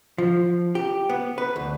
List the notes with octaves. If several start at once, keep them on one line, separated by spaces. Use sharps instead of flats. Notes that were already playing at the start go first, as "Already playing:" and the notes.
F3
G4
B3
B4
D2